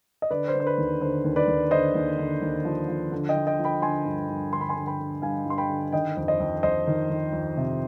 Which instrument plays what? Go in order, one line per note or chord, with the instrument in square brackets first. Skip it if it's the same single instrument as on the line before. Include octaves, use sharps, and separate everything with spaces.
[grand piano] D#5
D3 B4 D5
C5
D3
C5
B4
D#2
D3 C5
D#2
B4 D5
D#2
D3 C5 D#5
D#2
D3
D#2
F3
F3
D3
D#5 G5
F3
D#5 G5
F3
G5 B5
D3 G#5 C6
G2
G2
D3 C6
B5
G#5 C6
D3
G5 B5
D3
G2 F5 G#5
G2 C6
G5 B5
D3
D#3 D#5 G5
F2
C5 D#5
F2
F2 C5 D#5
D#3
D#3
F2
C3